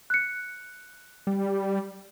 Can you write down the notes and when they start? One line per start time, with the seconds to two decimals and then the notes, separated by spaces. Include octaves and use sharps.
0.10 F#6 C#7
1.27 G3